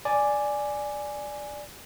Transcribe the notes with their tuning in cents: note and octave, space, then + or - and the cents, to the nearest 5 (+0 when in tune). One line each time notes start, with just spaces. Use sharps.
D5 +0 G#5 +0